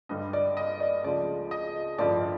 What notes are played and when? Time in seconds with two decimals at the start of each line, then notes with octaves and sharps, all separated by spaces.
0.09 G2 D3 G3 D#5
0.33 D5
0.57 D#5
0.80 D5
1.04 C#2 C#3 F3 A3 D5
1.51 D#5
1.98 A1 G2 D3 F3 D5